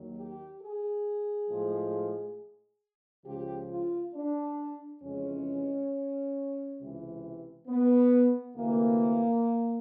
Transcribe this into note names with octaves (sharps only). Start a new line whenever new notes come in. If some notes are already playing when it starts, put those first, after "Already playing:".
Already playing: D#2 D#3 F#3
G4
G#4
A2 F3 G#3
C#2 C#3 F3 G4
F4
D4
F2 C#3 E3 G#3 C#4
C#2 C3 E3
B3
D2 C3 E3 A#3